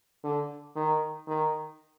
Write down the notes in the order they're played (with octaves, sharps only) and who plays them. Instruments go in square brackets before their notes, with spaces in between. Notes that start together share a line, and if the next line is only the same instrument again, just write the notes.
[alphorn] D3
D#3
D#3